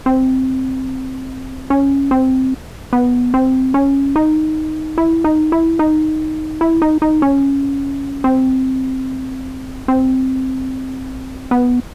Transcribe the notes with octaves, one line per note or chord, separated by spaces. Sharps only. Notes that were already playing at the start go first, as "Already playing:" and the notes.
C4
C#4
C4
B3
C4
C#4
D#4
E4
D#4
E4
D#4
E4
D#4
D#4
C#4
C4
C4
B3